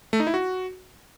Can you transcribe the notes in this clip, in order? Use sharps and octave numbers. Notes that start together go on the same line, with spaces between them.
A3
D#4
E4
F#4